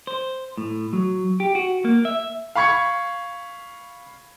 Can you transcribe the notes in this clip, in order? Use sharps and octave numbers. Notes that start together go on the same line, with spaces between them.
C5
A2
F#3
G4
F#4
A#3
E5
F5 B5 C#6 G#6 C#7